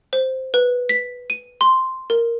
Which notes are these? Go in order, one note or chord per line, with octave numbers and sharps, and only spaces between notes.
C5
B4
B6
D#7
C6
A#4